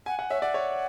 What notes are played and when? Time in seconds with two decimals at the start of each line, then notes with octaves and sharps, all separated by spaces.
0.06 F#5 G#5
0.19 F#5
0.30 C#5 E5
0.42 D5 F#5
0.54 C#5